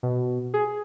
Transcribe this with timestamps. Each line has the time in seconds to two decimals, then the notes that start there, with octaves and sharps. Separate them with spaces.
0.03 B2
0.54 G#4